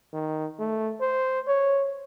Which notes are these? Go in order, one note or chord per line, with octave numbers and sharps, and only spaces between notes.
D#3
A3
C5
C#5